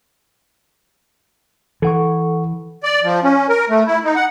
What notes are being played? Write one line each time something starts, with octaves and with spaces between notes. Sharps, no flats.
E3 A4 F#5 C#6
D5
F3
C#4
A#4
A3
E4
D#4
F#5